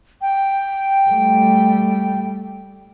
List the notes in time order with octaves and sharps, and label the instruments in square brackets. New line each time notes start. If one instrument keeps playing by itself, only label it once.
[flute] G5
[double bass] G3 A3